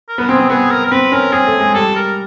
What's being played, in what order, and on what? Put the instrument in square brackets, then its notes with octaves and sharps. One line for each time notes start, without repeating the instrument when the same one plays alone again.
[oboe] A#4
[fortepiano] B3
[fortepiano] C4 [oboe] G#4
[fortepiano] C4
[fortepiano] B3 [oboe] G#4
[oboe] A#4
A#4
[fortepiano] C4 [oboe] B4
[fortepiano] C#4 [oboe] A#4
[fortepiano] C4 [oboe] G#4
[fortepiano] A3
G#3
[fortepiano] G3 [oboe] A4
[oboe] A#4